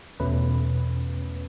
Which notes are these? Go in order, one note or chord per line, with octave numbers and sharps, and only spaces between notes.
E2 B2 A3 C#4 B4